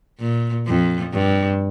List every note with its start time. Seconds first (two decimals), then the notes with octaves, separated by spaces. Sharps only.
0.20 A#2
0.67 F2
1.13 G2